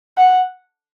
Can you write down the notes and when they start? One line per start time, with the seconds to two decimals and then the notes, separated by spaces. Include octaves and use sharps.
0.18 F#5